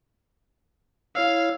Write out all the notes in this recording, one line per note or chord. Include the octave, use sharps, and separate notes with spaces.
E4 C#5 F5 E6